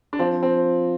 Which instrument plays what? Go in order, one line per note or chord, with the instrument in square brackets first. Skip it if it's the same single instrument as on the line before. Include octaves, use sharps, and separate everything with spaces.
[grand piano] D4
[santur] F3 [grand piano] C4
[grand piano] C4